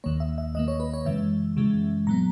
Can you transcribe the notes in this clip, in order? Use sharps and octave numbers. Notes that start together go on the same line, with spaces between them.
D#2 D#3 A#3 C#5
E5
E5
D#2 D#3 A#3 D#5
C#5
B4
C#5
F#2 C#3 E3 G#3 E5
F#2 C#3 E3 G#3
A#2 F#3 B3 A#5